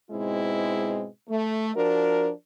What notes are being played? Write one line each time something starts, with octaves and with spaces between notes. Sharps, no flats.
G#2 B2 G#3 C4 E4
A3
F3 D4 F#4 A#4